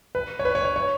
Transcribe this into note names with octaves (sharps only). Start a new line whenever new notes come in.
B4
C#5
B4
C#5
C#5
C#5